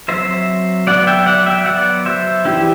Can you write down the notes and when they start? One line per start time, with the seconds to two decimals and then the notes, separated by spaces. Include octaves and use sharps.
0.08 F#3 C4 C5 E5
0.87 F#3 B3 D5 F#5
1.07 E5 G5
1.26 D5 F#5
1.46 E5 G5
1.66 F#3 B3 D5 F#5
2.06 C5 E5
2.45 E3 G3 C4 E4 G4